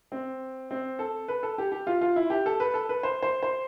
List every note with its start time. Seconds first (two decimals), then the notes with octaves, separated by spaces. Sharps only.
0.12 C4
0.71 C4
0.99 A4
1.28 B4
1.43 A4
1.58 G4
1.72 G4
1.87 F4
2.01 F4
2.16 E4
2.30 G4
2.46 A4
2.60 B4
2.74 A4
2.89 B4
3.03 C5
3.22 C5
3.43 C5